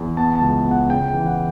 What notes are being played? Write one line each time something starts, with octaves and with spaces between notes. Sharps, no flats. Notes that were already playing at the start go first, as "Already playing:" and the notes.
Already playing: E2
B3 A5
A5
C#2
B3
F#5
C#3 G5
G5
E3
F#5